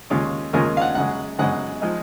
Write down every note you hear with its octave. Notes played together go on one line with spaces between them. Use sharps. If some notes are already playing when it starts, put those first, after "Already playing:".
D#2 C#3 G#3 C#4 F4
D#2 C#3 G#3 C#4 F4 A#4
F5
F#5
F#2 C#3 G#3 F#5
F#2 C#3 G#3 F#5
F3 G#3 D#4